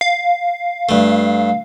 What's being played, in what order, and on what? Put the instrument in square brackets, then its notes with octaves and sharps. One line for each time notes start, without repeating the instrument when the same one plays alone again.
[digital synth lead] F5
[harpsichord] G2 A3